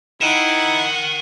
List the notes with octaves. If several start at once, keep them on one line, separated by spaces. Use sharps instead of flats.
D#4 E4 A#4 F#5 G5 D#7 E7